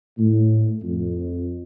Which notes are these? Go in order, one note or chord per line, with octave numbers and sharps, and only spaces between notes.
A2
F2